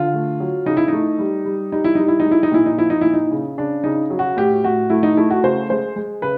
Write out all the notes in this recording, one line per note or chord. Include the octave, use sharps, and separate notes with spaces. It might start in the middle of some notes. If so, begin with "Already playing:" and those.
Already playing: D3 F4
A3
F#3
C#3 D#4
E4
A3 D#4
G3
G3
G3 D#4
E4
G3 D#4
E4
D#4
G#3
E4
D#4
A#2 E4
D#4
F3 E4
D#4
A#2 E4
D#4
C#3
C#3 D4
C#3 D#4
F#3
F#4
A2 G4
A2 F#4
A3 E4
D#4
A3 E4
F#4
C#3 C5
G#3 C5
G#3
C#3 B4